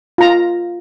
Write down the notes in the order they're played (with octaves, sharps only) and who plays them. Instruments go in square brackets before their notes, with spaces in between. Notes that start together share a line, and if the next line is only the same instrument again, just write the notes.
[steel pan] F4 A#5